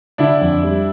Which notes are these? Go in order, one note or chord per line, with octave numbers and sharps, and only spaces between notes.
D3 D4 E4
F2
G3